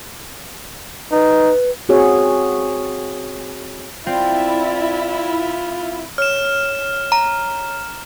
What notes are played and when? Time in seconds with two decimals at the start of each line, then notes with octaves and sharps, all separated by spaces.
1.12 D#4 B4
1.89 C4 F#4 G#4 C#5
4.07 C4 E4 F4 D5
6.18 C#5 F6 E7
7.12 A#5